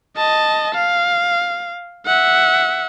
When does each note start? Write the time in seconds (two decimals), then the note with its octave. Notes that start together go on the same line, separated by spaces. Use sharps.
0.17 D#5 A5
0.75 F5
2.06 E5 F#5